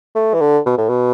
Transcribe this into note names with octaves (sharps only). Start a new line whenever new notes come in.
A3
E3
D3
B2
A2
B2